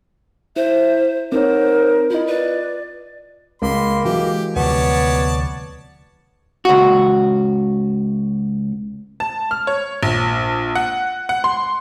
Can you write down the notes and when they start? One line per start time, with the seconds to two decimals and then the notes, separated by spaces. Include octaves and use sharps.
0.56 E4 C5 E5
1.32 C4 D#4 A#4 C5 C#5
2.10 E4 F4 D#5
2.27 B4 D5
3.62 C#2 A#3 B5 C6
4.05 E3 F#3 G#3 G4
4.56 D2 C3 F3 B3 C#5 D5 A5
6.65 C#2 F#4
9.20 A5
9.51 F6
9.67 C#5
10.03 A#1
10.75 F#5
11.29 F#5
11.44 C6